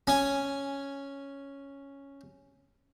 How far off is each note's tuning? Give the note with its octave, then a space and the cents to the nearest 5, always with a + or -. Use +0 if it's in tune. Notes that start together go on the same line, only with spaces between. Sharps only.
C#4 +0 G#5 +0